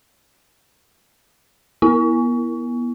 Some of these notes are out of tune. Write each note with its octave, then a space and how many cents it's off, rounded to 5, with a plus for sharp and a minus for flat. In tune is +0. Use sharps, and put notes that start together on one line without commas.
B3 -25 E4 +0